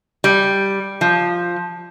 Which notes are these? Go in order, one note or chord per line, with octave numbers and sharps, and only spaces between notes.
G3
F3